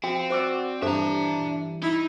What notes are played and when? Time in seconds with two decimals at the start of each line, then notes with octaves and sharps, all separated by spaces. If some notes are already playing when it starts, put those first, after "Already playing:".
0.04 F3 C4 F#4 G5
0.30 F#4 C5 D5 D6 E6
0.82 G2 E3 D4 G4 A4 C5 E5 A#5
1.83 D#4 E4